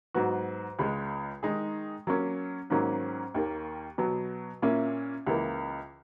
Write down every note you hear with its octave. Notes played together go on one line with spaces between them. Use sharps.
G#2 F#3 B3 F#4
C#2 C#3 G#3
D#3 G#3 D#4 G#4
F#3 A#3 C#4
G#2 D#3 F#3 A#3 C#4
D#2 D#3 A#3
B2 F#3 B3
A#2 A#3 C#4 E4
C#2 C#3 E3 A#3